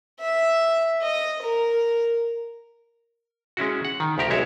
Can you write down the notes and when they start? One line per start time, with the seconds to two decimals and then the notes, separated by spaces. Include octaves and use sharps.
0.20 E5
1.02 D#5
1.42 A#4
3.57 G#3 C#4 E4 F#4
3.85 F#5
4.00 D#3
4.18 D2 F3 G4 A#4
4.30 B1 G#3 E4 C#5 E5